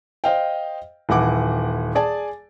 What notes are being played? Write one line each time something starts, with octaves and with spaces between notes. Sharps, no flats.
C5 D#5 F5 G5
D#1 E3 E4 F#5 D6
G#4 D5 G#5 A5